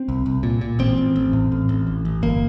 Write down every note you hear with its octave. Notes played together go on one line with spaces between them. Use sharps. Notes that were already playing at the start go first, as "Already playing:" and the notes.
Already playing: C4
C2
C2
A#2
A#2
A1 C4
A1
A1
A2
A2
A1
A1
A1
G1 A#3